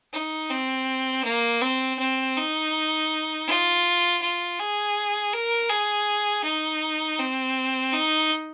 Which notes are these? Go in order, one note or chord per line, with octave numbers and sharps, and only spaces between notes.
D#4
C4
A#3
C4
C4
D#4
F4
F4
G#4
A#4
G#4
D#4
C4
D#4